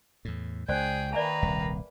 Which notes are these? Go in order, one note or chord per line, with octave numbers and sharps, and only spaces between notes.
E2 A2
C#2 G#4 C5 D5 G5
D#3 A#3 B4 D5 E5 G#5 A#5
D#1 C2 E5